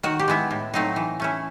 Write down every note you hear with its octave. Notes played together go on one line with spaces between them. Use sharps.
D#3 F#4
G4
G#3 B3 E4
A2
F#3 A3 C4 D#4
E3
A3 C#4 E4